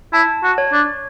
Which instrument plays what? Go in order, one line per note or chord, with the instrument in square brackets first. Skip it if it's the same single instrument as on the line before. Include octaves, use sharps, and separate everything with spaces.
[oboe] E4 [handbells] A5
[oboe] F#4
[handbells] C#5
[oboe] D4